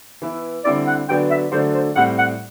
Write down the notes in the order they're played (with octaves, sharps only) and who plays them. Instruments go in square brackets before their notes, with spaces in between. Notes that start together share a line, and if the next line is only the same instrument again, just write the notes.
[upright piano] E3 B3 E4
[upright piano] D3 G3 C4 E4 [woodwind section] D5
[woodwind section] F#5
[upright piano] D3 F#3 B3 D4 [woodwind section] G5
[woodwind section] E5
[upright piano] D3 F#3 A3 D4 [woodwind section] C5
[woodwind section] C5
[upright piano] A2 G3 C4 [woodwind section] F#5
[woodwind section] F#5